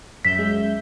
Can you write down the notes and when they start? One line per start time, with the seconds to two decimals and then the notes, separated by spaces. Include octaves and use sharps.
0.25 F#2 E5 G6 B6
0.39 G#3